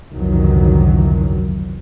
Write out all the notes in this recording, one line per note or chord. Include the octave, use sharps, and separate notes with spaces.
G1 C2 F2 D#3 E3 F#3